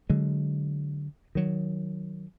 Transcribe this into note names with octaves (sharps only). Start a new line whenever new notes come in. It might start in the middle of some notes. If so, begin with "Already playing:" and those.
D3 F#3 G#3
D#3 F#3